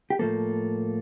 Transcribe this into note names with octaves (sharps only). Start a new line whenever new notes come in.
G4
A2 F3 A#3 A4